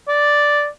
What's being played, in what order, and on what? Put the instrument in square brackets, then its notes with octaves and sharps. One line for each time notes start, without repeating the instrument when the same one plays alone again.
[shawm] D5